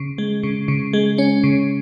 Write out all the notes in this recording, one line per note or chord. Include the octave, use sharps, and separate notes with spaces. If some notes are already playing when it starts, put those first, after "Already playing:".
Already playing: C#3
G#3
C#3
C#3
G#3
C#4
C#3